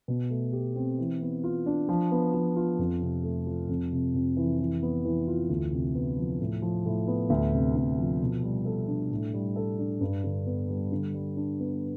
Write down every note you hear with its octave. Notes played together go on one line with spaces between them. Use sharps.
B2
A3
G4
C4
E3
B3
F4
D4
F3
B3
F3
F4
F2
C3
A3
F3
F2
C3
F2
E3
E3
B3
E3
F4
D2
C3
B3
F3
A2
F3
A2
B3
D2
C3
D2
F3
B2
G3
A4
D4
A2
G3
A4
D4
G2
D3
B3
G3
D3
G3
D4
B3